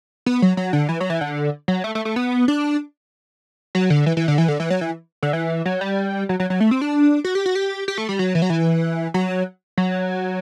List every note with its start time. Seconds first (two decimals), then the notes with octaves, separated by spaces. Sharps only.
0.26 B3
0.42 F#3
0.57 F#3
0.73 D3
0.89 E3
1.00 F#3
1.10 E3
1.21 D3
1.68 F#3
1.84 A3
1.95 A3
2.05 A3
2.16 B3
2.48 D4
3.75 F#3
3.90 D3
4.06 E3
4.17 E3
4.28 D3
4.38 E3
4.48 D3
4.60 E3
4.70 F#3
4.81 E3
5.23 D3
5.33 E3
5.66 F#3
5.81 G3
6.29 F#3
6.40 F#3
6.50 F#3
6.60 A3
6.71 C4
6.81 D4
7.24 F#4
7.35 G4
7.46 F#4
7.55 G4
7.88 G4
7.98 A3
8.09 G3
8.19 F#3
8.35 E3
8.42 F#3
8.50 E3
9.14 F#3
9.78 F#3